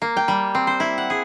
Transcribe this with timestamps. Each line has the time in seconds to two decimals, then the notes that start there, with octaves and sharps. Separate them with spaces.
0.02 A#3
0.17 G5
0.28 G3
0.55 C4
0.67 C5
0.80 E4
0.98 F#5
1.10 G#4